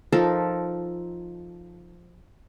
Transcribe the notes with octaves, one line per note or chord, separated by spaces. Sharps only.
F3 D#4 A4 A#4